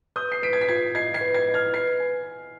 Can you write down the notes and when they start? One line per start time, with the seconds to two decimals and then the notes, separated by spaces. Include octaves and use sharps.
0.16 B4 D#6 G6
0.32 C7
0.42 B4 B6 D7
0.53 G#6
0.61 B6
0.68 F4 G#6 C7
0.95 D#5 G#6 C7
1.14 G#6 C7
1.21 B4
1.34 G#6 C7
1.48 D#5
1.54 F6 G#6
1.74 B4 G#6 C7
2.00 G#5
2.26 G#5